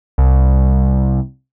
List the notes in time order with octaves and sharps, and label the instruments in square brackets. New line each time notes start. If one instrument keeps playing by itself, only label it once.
[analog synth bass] C2